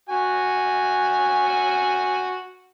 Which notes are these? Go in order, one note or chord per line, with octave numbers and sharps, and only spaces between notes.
F#4 G#5